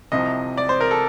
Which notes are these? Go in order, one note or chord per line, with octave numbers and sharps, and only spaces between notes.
C2 C3 F3 D#5
D5
C5
A#4
A4